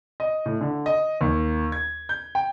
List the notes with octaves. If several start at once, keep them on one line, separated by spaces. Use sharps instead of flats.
D#5
A2
D3
D#5
D#2
G#6
G6
G5